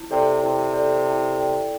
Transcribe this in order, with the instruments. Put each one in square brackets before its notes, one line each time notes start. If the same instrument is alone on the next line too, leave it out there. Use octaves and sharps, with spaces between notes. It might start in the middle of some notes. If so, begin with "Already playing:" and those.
Already playing: [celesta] E4
[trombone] C3 [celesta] A4 D5 G5
[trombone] C3 [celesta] E4
[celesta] A4 D5 G5
E4
A4 D5 G5